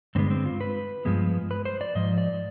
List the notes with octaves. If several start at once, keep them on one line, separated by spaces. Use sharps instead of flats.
G2 D3 G#3 B3 C4
C4
F4
B4
G2 F3 G#3 B3
B4
C5
D5
G#2 F3 D#5
D5